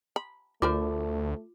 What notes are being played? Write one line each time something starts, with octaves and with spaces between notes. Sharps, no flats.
B5
D2 A3 F4 A#4 C5 D5 D6